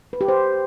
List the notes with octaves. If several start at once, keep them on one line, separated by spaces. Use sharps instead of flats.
B4
G4
C5